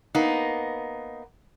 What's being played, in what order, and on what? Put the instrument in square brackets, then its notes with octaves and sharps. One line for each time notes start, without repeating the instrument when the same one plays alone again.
[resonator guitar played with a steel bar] A#3 B3 D#4